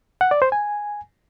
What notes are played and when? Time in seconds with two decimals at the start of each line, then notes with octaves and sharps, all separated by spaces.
0.21 F#5
0.31 D5
0.42 C5
0.52 G#5